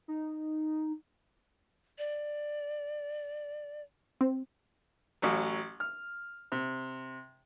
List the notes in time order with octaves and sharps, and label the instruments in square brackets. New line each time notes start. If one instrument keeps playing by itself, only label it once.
[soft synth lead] D#4
[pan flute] D5
[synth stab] C4
[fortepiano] A1 F#3
F6
C3